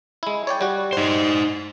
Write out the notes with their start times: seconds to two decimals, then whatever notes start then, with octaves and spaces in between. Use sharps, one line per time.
0.23 G#3 E4
0.47 C#5 D5 G5
0.61 G3 F#4
0.93 D#4 C5